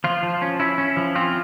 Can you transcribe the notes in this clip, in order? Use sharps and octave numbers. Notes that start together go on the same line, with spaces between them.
F3 F4
F3
C#4
C#4 E4
C#4
F3
C4 F4